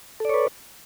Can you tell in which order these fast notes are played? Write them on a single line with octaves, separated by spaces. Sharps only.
A4 D5 C#5 B4